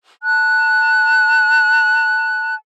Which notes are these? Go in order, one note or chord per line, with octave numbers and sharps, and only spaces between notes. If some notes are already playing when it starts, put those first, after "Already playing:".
A5 F#6